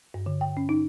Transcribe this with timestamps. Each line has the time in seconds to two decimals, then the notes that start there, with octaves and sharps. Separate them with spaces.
0.14 G2
0.26 D3
0.41 G5
0.57 C#4
0.69 D#4